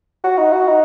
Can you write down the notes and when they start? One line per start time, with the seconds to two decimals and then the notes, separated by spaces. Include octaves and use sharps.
0.24 F#4
0.38 D#4
0.52 F#4
0.68 D#4